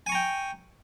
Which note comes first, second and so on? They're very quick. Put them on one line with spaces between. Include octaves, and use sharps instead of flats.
G#5 C#6 A#5 G5